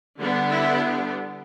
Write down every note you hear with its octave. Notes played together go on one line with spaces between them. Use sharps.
D3 G3 B3 D4
E4